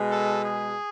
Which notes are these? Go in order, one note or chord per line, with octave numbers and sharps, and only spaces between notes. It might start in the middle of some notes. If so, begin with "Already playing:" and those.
Already playing: B2 G#3
A4
G#4